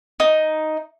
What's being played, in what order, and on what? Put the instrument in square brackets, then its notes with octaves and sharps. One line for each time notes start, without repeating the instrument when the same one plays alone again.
[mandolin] D#4